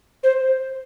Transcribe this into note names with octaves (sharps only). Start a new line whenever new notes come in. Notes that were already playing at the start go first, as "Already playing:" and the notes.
C5